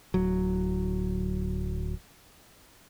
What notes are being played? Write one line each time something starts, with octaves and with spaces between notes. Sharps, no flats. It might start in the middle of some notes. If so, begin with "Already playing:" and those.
D1 F#3